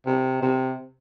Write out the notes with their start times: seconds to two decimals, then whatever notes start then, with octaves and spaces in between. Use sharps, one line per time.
0.06 C3
0.42 C3